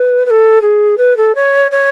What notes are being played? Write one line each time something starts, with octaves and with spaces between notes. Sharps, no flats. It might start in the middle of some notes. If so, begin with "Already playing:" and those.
Already playing: B4
B4
A4
G#4
B4
A4
C#5
C#5